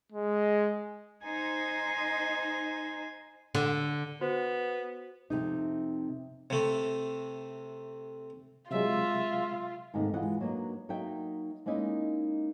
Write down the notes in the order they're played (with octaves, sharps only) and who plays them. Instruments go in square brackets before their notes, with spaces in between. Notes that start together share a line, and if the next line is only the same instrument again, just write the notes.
[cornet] G#3
[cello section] D#4 C5 [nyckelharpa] G#5
[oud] D3
[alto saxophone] B3 [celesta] F#4 C5
[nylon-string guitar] F2 A2 C3 D#4
[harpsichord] C3 A3
[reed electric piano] C3 F#3 G#3 [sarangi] F4 [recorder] E5
[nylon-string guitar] G#2 C3 D#3 A3 A#3
E2 E3 G#3 F4 D#5 F#5
F#3 A#3 B3 D4 D#4
F#3 A#3 D#4 F#4 E5 G5
G#3 A#3 C#4 D#4 E4